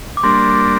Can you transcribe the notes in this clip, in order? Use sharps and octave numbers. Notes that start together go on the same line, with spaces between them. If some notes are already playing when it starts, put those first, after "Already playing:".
D6
G3 A#3 D4 C6